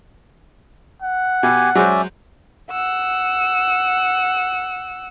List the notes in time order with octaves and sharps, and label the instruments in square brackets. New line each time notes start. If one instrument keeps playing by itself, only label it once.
[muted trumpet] F#5
[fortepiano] B2 [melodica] G4 G#5
[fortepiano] F#3 G#3 C5 [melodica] C#4 D5 E5
[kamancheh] F#5 E6